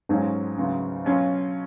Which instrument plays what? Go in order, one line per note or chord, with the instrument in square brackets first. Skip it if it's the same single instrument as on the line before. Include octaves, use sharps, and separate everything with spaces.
[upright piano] B1 B2 F#3 C#4 F4 [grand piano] G#2
[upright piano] D2 C#3 F#3 B3 F#4
B2 F#3 C#4 F4